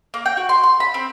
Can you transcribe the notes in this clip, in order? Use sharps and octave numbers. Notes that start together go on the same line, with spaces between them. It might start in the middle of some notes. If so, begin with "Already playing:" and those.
A#3
G5
F#4
C6
C6
B5
C4